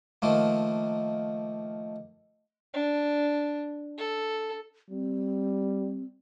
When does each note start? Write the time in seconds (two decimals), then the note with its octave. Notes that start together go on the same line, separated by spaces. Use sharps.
0.22 D#3 F3 A3 A#3
2.74 D4
3.98 A4
4.90 G3 C4